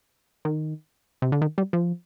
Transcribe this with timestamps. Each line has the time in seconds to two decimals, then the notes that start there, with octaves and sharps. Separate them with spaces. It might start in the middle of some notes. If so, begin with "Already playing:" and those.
0.45 D#3
1.22 C3
1.32 D3
1.42 D#3
1.58 G3
1.73 F3